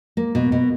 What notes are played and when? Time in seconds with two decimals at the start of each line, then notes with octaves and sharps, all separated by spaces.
0.17 A#3
0.35 B2
0.52 B2